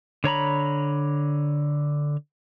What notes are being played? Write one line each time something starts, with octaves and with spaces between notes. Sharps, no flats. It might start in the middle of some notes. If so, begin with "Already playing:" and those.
D3 C#5 A#5 B5